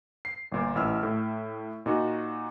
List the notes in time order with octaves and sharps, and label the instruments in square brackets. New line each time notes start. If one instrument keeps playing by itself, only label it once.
[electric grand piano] C7
G1 A#2 A#4
A1 E4 E6 F6
A2
A#2 D#4 F#4